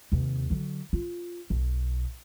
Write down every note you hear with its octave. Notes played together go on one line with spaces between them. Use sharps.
D#2 C3
D3 F#3
F4
B1